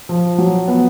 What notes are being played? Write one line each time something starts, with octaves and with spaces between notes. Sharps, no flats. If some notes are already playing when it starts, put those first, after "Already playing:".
F3
F#3
B3